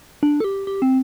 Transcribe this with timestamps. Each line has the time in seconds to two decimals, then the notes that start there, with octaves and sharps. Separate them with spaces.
0.23 D4
0.40 A4
0.44 G4
0.67 G4
0.82 C4